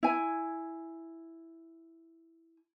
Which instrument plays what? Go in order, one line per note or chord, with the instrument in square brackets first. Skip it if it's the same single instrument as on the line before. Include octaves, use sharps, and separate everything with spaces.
[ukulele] E4 G#5